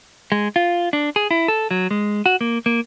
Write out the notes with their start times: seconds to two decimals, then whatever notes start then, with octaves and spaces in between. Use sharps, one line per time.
0.32 G#3
0.56 F4
0.93 D4
1.16 G#4
1.31 E4
1.48 A4
1.71 F#3
1.91 G#3
2.26 F#4
2.41 A#3
2.66 A#3